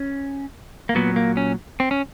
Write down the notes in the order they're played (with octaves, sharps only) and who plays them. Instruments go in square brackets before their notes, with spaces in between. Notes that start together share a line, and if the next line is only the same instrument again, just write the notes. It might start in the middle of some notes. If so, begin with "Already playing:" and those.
Already playing: [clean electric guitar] C#4
A#3
A#2 F#3 B3
A#3
C#4
C4
C#4